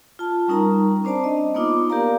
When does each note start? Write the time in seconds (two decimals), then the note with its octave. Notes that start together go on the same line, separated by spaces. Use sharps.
0.19 F4 A5
0.48 G3 C#4 D#4 A#4 A#5
1.04 C4 D4 C5 D5 A5
1.24 D#5
1.55 A#3 B3 D#4 F4 D6
1.90 G4 A#4 D5 F5 A#5